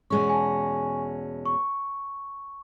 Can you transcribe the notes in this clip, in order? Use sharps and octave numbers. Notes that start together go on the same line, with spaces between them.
E2 B2 G#3 C#4 C#6
G#5
A5
C#6